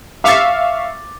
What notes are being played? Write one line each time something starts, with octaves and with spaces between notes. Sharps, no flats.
E5 F5 C#6 D6 A6